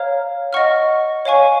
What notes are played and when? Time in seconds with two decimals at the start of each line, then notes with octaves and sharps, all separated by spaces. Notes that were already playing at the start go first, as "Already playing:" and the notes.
Already playing: C#5 F5 A#5 F6
0.53 D#5 F#5 C#6 F6
1.25 C#5 F5 G#5 C#6